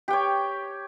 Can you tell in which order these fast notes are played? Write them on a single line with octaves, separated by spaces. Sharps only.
G4 G5 C#5